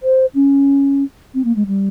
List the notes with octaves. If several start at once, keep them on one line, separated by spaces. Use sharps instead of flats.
C5
C#4
C4
A#3
G#3
G3